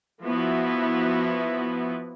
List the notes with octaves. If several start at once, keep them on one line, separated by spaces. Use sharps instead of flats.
F3 B3 E4 F#4